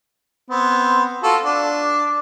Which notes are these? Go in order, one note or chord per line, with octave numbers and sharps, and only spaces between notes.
B3 C4
F4 F#4 A4
D4